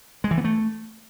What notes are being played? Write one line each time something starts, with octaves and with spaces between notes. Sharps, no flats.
G#3
E3
B3
A3